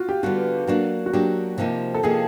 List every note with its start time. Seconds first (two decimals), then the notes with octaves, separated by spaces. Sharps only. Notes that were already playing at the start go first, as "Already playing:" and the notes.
Already playing: F4 F#4
0.09 G4
0.23 D3 G3 B3 F#4
0.67 F#3 A#3 D4 F#4
1.06 F#4
1.13 F#3 A#3 D4 G4
1.58 C3 F3 A#3 D#4
1.94 A4
2.03 C3 F3 A#3 D#4 G#4